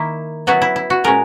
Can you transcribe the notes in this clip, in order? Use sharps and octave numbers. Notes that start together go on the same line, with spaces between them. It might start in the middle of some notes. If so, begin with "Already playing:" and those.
Already playing: D#3 A#3 E4
F#3 B3 E4 F#4
E4
E4
F#4
A#2 G#3 C#4 A#4